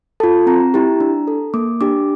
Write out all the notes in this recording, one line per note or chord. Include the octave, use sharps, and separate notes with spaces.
F4 A4 A5
C4 A#5
E4 G4
D4
A4
A#3 D6
D4 G4 D6